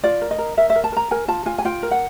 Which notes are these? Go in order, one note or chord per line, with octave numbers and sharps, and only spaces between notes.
F4 D5
A#4
D#5
A#4
A#4 E5
E5
A#4
A5
A#4 A#5
A#4 G#5
F4 A5
F4 G#5
G#5
F4 G5
A#4
F#5